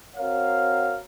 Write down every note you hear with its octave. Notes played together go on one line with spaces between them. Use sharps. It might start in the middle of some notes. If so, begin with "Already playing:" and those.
C4 F#4 A#4 C#5 F5